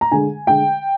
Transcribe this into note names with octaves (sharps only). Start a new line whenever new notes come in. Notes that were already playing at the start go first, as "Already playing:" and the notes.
A#5
D3 G#3 G#5
D3 G#3 G5